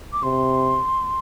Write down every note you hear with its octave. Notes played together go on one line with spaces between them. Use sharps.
D6
C3 C6